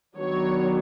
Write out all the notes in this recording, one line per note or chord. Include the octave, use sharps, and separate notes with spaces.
D#3 F#3 B3 D4 C#5